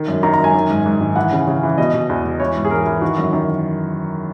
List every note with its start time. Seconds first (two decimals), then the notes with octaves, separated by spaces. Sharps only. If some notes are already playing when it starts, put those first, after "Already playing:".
Already playing: D#3
0.08 F#2
0.23 D#3 A#5
0.33 A#5
0.39 F#2
0.44 G#5
0.54 D#3
0.69 G#2
0.86 G#2
1.01 D#3
1.16 E3 F#5
1.32 C#3
1.47 C#3
1.63 E3
1.78 B2 D#5
1.94 B2
2.09 E2
2.25 B2
2.39 E3 C#5
2.55 G#2
2.65 G#4
2.71 E3 A#4
2.86 E3
3.02 D#3 F#4
3.18 F#2
3.33 D#3